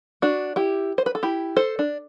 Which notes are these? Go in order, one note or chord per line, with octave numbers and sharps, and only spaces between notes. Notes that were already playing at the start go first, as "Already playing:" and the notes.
D4 F#4
E4 G4
C5
B4
A4
E4 G4
A4 C5
D4